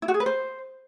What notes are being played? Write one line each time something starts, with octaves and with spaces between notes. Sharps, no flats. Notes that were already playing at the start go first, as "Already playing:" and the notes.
E4
F#4
G#4
B4
C5